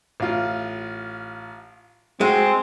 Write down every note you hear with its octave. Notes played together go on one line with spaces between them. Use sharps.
A1 F4
G#3 C4 F#4 G#4